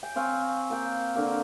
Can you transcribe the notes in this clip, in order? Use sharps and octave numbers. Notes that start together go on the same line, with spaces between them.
G5 G#5
C4 F5 G#5 C#6
A#3 G5
D3 A#3